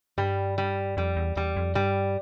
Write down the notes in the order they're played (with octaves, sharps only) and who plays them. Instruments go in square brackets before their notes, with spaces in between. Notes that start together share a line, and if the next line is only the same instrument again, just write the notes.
[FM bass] G2 [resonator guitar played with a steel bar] G3
[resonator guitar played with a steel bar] G3
[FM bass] F2 [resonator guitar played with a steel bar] G3
[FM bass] E2
[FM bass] E2 [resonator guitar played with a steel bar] G3
[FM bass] F2
[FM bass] G2 [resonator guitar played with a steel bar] G3